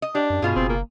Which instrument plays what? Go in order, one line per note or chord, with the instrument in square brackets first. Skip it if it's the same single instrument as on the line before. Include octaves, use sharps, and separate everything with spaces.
[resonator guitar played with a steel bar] D#5
[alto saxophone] D4 [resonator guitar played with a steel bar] G4
[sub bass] F#2
[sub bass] G2 [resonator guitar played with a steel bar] B2 F4 G#4
[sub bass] F#1 [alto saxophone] C4
[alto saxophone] A#3